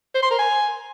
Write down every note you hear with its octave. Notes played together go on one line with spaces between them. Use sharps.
C5
C6
A#4
G#5